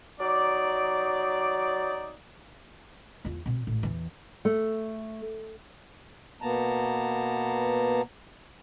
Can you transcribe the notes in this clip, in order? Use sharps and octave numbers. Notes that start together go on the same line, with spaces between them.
F#3 D#4 D5
E2 F4
B2 C4
A1
E2 E3
A3
B2 A#3 B3 A5 A#5